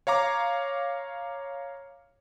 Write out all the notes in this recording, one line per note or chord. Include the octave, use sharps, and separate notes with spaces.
C#5 F5 A#5 D6